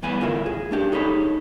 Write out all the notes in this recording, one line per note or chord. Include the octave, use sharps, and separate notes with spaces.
G2 E3 B3 G#5 B5
D2 A2 F4 A#4 E5
G#4
A3 D4 G4
D#4 G#4 A4 C#5 B5